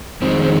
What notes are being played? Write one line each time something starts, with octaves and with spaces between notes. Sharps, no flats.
F2 D#3 G#3 C4
C4